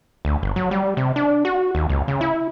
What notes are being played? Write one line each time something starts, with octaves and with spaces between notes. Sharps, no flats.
D2
G1
F#3
G3
C3
D4
F#4
D#2
C#2
C#3
E4